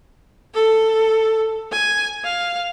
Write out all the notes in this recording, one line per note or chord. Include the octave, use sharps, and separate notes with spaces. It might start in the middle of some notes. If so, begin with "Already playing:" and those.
A4
G#5
F5